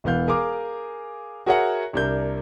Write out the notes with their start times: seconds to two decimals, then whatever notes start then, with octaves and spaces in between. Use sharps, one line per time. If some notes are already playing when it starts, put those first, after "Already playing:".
0.04 E1 E3 B3 F5 G6
0.28 G#4 A#4 F5 D6
1.46 F#4 G#4 A#4 C#5 E5 F#5
1.93 C2 C3 D4 A#4 G6